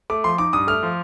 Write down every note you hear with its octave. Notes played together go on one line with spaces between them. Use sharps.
A3 D6
F3 C6
D#4 D6
G2 D#6
A3 F6
F3